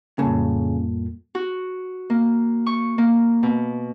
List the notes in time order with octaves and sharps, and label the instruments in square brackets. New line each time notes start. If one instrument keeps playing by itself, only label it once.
[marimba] F2 A2 G3 [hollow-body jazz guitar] C#3 [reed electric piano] A#3
[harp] F#4
A#3
C#6
A#3
B2